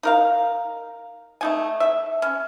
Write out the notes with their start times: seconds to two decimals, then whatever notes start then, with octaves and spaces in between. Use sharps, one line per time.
0.03 D#4 A#4 F5
1.41 A3 D#4 G#5
1.80 E5
2.22 C#4